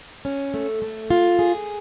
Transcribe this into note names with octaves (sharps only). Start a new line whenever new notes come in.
C#4
A3
A3
F4
G#4